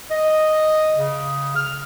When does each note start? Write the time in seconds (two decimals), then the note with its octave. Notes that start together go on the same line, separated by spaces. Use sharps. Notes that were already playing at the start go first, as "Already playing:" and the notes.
0.10 D#5
0.96 C#3
1.55 F6